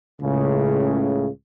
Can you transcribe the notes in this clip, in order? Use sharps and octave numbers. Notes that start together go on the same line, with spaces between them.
C#2 A2 C#3